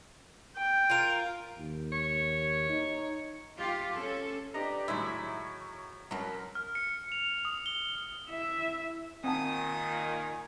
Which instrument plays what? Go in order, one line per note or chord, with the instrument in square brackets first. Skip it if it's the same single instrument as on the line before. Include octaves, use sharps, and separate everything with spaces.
[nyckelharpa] G5
[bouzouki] F4 A#4
[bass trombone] D#2
[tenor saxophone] C#5
[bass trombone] D#4
[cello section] F4 G4
C#4 A4
[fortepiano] D4 D#5 A#5 [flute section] G4 B4 D5
[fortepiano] A2 D#3 F#3 [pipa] G#3 E4 [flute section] C#6
[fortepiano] F#2 [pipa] B2 F#3 [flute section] A#4
[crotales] F6
C#7
F7
D#6
G7
[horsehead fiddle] E4 E5
[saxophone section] A#2 D#3 [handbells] C4 F#5 A5 [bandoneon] G#5 [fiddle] D#6